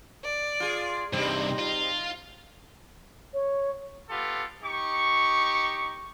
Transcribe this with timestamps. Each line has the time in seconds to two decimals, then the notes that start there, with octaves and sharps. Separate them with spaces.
0.24 D5
0.60 F4 G#4
1.13 G2 C3 G3 C4 D#4
1.59 F4
3.34 C#5
4.09 B3 F4 G4 A4
4.63 D#4 G4 C#6